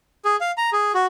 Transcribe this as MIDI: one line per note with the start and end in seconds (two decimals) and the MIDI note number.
0.25 0.36 68
0.41 0.52 77
0.57 0.70 82
0.73 0.92 68
0.94 1.06 66